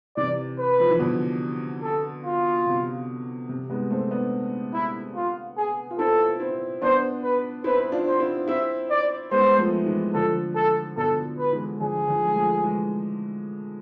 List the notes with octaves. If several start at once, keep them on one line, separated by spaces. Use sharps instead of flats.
C3 E3 D5
B4
F3
E3
B2 D3
A4
F4
C3
C3
G#3 B3
A3 C4
B3 D4
E4
F4
G#4
F4
C4 E4 A4
C4 E4
B3 D4 C5
B4
C4 E4 B4
D4 F4
C5
C4 E4
C4 E4 E5
D5
G#3 B3 C5
F3 A3
E3 G#3
D3 F3 A4
A4
B2 D3 A4
B4
E3 G#3
D3 F3 G#4
D3 F3
G#3
F3 A3
E3 G#3